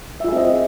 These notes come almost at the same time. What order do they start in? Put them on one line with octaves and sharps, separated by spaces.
E5 F4 G#4 C4 D#5